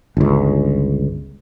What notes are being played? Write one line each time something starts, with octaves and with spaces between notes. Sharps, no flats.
G1 C#2